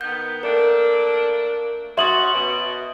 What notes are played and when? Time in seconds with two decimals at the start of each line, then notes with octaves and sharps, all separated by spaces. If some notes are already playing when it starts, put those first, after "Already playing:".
0.01 D#3 B3 G6
0.43 A3 A#3 D4 A#4
1.98 C#4 F#4 E5 C6 D#6 A6 F#7
2.33 B2